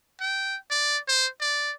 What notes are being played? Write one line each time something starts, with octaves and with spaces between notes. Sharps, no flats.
G5
D5
C5
D5